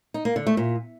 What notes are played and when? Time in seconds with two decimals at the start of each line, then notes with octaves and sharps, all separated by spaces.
0.14 D#4
0.25 A#3
0.36 D3
0.47 A3
0.57 A#2